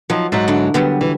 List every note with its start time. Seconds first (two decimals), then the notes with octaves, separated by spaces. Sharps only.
0.10 F3 F#3 D#4
0.32 G#2 F#3 D5 E5
0.48 D3 D4 E4
0.74 D3 F#3 G3 B3
1.01 E3